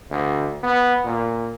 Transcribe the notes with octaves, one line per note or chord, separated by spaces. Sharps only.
D2
B3
A#2